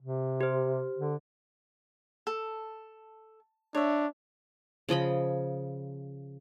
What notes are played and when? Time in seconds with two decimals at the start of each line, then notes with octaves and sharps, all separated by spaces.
0.01 C3
0.41 G4 C5
0.99 D3
2.27 A4
3.75 D4 C#5 E5
4.89 C#3 F3 D#5 B5